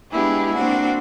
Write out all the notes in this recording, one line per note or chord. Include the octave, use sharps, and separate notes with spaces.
G#3 B3 D4 E4 G4 G#4
A#3 C4 D4 F#4